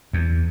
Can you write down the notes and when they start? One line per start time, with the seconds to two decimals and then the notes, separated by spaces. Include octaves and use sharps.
0.13 E2